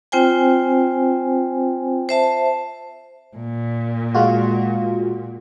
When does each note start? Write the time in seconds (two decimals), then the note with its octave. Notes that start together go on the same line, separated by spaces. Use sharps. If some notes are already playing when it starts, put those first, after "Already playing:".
0.12 C4 F4 C5 G5 G#5
2.09 C5 E5 A5
3.37 A#2
4.14 G#3 F4 F#4